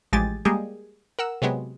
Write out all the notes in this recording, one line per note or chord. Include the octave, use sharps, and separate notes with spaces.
A1 F3 G#3 G4 G#5 A6
G3 G#3 A#3 G4 G#4
A#4 F#5 E6
C3 F#3 G#3 B3